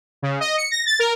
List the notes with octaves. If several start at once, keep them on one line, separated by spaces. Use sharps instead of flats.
C#3
D#5
C#7
A#6
A6
A#4